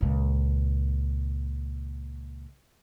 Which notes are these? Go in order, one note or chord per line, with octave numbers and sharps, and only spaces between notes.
C#2 A#2